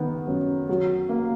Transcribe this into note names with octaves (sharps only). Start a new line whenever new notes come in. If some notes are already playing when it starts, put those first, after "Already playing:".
Already playing: D#3 B3
F#2
F#3
A#3